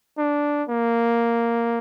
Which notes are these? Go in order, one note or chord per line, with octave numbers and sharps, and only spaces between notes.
D4
A#3